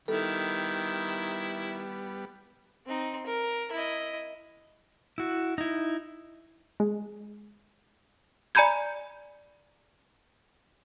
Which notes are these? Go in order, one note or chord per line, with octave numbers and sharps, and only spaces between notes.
D#3 G3 B3 E4 A4
C4 D#4
A#4
E4 D#5
E4 F#4
D#4 E4
G#3
D5 G#5 A#5 B5 G6 G#6